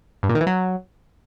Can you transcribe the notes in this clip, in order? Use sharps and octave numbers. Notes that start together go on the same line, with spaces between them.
G2
A#2
D#3
E3
F#3